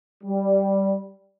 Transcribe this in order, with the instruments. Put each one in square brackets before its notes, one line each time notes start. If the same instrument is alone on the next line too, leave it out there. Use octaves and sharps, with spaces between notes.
[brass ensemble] G3